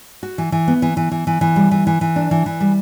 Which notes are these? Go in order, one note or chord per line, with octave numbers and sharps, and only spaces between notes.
F#4
E3
E3
B3
E3
E3
E3
E3
E3
G3
E3
E3
E3
D4
E3
E3
G3